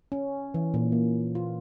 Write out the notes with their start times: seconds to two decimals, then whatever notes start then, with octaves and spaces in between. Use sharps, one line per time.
0.12 C#4
0.54 E3
0.74 A#2
0.92 A#3
1.35 F4